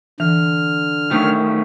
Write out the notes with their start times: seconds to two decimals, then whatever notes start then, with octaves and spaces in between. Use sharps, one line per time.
0.20 D3 E3 F6
1.11 D#3 A3 C#4